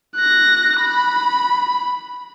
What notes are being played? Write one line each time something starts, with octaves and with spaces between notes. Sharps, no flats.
F#6 A#6
B5